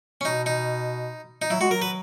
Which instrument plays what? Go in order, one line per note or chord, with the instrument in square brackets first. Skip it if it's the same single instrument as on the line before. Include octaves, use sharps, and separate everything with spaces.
[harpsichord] C#4
[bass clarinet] B2 [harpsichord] D#4
[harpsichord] D#4
D#4
[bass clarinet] F#3 [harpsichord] E4
[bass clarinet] G#3 [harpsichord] F#4
[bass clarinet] F#3 [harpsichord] A#4
[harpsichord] B4